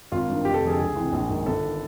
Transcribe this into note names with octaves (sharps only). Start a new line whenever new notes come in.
G#1 F4
G2 D#3
F1 G4
A4
F2 D3 G#4
A4
C#2 G#4
C3 E3
A#1
G#2 D#3
G1 A4
D#3